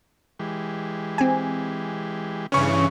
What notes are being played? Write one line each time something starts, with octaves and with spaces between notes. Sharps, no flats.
E3 G#3 G4
C4 G#5
G2 C#3 E3 C#4 C#6